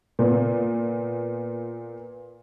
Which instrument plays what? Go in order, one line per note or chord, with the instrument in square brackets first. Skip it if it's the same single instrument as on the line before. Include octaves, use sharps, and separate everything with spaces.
[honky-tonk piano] A#2 B3